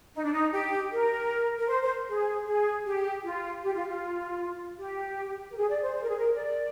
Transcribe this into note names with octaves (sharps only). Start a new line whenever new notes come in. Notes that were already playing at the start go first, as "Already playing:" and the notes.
D#4
D4
D#4
G4
A#4
A#4
C5
C5
G#4
G#4
G4
F4
G4
F4
F4
G4
A#4
G#4
D5
C5
C5
A#4
G#4
A#4
D5